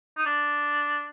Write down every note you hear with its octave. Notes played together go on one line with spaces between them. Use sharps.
D#4
D4